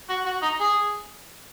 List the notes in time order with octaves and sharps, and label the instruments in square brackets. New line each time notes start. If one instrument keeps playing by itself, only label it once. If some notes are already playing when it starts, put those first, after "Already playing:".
[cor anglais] F#4
F#4
D#4
G#4